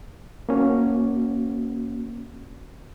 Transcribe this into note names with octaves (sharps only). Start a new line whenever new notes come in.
A#3 C#4 F#4